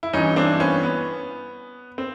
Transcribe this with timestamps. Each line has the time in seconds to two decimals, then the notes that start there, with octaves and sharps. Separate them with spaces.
0.03 E4
0.13 G2 E3 C#4 D#4
0.36 C4 D4
0.60 B3 C#4
0.83 B3
1.98 C4